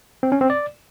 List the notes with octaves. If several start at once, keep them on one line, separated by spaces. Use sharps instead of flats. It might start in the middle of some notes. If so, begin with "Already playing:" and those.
C4
C#4
C4
D5